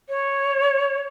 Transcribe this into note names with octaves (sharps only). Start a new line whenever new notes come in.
C#5